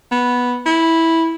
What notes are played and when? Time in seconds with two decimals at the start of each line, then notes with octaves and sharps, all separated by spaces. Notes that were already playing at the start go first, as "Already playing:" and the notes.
0.12 B3
0.66 E4